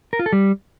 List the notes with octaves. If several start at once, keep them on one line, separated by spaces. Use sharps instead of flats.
A#4
F4
A4
G3